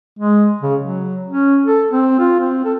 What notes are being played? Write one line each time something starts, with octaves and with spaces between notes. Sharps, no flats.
G#3
C#3
F#3
C#4
A4
C4
F4
C4
A4